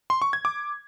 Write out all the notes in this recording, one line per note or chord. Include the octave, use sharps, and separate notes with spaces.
C6
C#6
G#6
D6